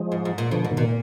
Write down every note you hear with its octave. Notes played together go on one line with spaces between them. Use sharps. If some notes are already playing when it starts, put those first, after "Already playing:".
Already playing: F3 G#3
G#2
G#2
A#2
B2 D3 F3
G#2
B2 D#3
A#2